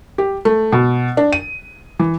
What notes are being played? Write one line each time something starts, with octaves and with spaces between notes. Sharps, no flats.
G4
A3
B2
D4
D#7
E3